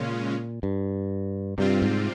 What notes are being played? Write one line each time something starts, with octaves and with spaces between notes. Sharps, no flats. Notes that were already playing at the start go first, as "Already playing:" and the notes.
Already playing: A#2 C#3 G#3 C#4 F4
G2
G2 C3 G3 C4 F4
G#2